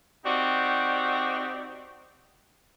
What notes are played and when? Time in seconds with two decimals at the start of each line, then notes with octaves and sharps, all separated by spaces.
0.25 C4 D#4 F#4 G4 D5